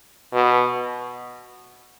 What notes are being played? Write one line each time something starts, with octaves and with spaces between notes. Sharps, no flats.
B2